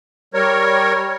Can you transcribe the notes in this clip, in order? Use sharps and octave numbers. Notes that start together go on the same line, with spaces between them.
G3 A#4 C#5